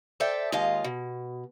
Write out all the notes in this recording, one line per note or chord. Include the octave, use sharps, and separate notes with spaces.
A4 C5 D5 E5 G5
D#2 G#3 F4 D#5 F5
B2